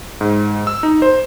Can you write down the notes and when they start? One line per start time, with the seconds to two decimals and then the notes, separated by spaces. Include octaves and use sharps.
0.21 G#2
0.67 E6
0.83 D#4
1.02 C5